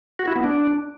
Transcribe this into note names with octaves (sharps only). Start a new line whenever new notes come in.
F#4
E4
B3
D4